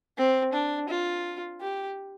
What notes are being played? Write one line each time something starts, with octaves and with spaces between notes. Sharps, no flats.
C4
D4
F4
G4